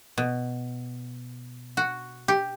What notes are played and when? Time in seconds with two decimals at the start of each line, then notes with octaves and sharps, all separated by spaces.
0.18 B2
1.77 F#4
2.28 G4